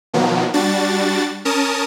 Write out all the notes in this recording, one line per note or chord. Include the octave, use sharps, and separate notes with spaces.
B2 D#3 F3 F#3 A#3 B3
G3 D4 F#4 A6
C#4 A#4 A5 D#6